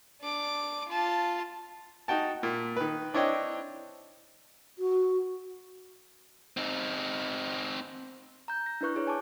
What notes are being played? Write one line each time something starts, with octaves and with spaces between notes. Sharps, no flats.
D4 D6
F4 A5
D#4 F#4 G5 A5
A#2
D#3 B4
C4 D4 E4 C#5 D#5 G5
F#4
C4 D#4
A#5 G6
A#6
D4 E4 B4 C#6 F#6
E4 G#4 B4 C#5
G#5 A5 C#6 D6